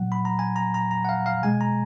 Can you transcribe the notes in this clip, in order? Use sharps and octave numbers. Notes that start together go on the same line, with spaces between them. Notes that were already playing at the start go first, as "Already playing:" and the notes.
Already playing: A#2 F#3 F#5
B5
A#5
G#5
A#5
A#5
A#5
F#5
F5
F5
B2 G#3 G#5
A#5